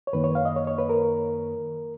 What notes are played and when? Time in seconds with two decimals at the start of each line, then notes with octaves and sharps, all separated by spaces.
0.07 C#5
0.13 F#2 D#3 A#3 B4
0.24 C#5
0.35 F5
0.45 D#5
0.56 C#5
0.67 C#5
0.78 B4
0.89 A#4